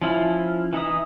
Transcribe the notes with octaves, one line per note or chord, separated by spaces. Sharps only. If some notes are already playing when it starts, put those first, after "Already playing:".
F3 C#4 E4 F4
E3 D#4 E5 D#6